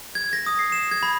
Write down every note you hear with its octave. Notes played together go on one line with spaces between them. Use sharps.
G#6
A#6
D#6
C7
E7
G#6
B5